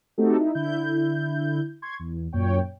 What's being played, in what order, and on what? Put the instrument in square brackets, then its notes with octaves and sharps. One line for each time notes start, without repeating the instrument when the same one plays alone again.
[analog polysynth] A3 C4 D#4 F#4 G4 A4
D#4 E4
D3 E4 G6
C6 C#6 G#6
E2
F#2 A#2 C#5 G5